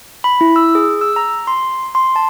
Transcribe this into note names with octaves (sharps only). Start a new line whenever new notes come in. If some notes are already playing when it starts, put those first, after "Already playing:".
B5
E4
E6
G#4
E6
A#5
C6
C6
A5